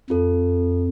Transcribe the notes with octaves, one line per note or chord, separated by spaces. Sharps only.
F2 F4 A4